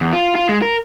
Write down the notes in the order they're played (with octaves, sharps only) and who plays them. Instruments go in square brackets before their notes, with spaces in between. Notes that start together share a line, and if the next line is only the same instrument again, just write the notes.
[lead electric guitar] E2
F4
F4
G#3
A#4